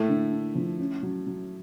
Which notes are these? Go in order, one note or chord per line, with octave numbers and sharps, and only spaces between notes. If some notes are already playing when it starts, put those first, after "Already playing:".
Already playing: A2 A3 A#3
D3
D4
F3
C#4
F#3
F#3